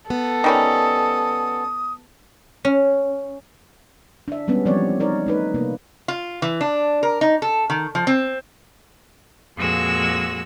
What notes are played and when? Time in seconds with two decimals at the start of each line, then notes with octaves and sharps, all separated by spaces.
0.10 B3 A4
0.44 D#3 G3 C#4 D#6
2.65 C#4
4.28 D4 E5
4.48 G3 G#3 B3 C#4
4.65 E3 F3 G3 C4 C#5 D5
5.00 D#4 A#4 C#5 D5
5.26 A3 D#4 B4
5.54 C3 A#3 B3
6.08 F4
6.42 E3
6.61 D4
7.03 A#4
7.21 D#4
7.42 A4
7.70 D#3
7.95 F3
8.07 C4
9.56 F2 A#2 G#3 F#4 E6